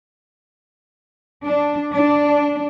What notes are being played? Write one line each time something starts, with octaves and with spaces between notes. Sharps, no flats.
D4
D4